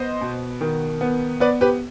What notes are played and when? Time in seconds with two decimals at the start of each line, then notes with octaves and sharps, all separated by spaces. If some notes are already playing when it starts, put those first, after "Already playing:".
Already playing: B3 C5 D#5
0.21 B2
0.61 D#3
1.01 B3
1.40 B3 B4 D5
1.61 G4 B4